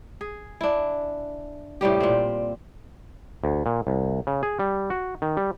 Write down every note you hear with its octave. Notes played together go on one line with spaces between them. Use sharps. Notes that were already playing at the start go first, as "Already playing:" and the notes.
G#4
D4 E4
A2 C3 G3 G4
A#2 C4
D2
A#2
C2
C#3
G#4
G3
F#4
D#3
G3